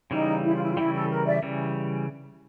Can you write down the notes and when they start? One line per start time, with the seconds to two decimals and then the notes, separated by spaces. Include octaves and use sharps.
0.11 C#3 E3 G3 D#4
0.44 E4
0.54 F4
0.62 E4
0.72 F4
0.77 C#3 E3 G3 E4
0.94 A4
1.10 A#4
1.26 D5 E5
1.43 C#3 E3 G3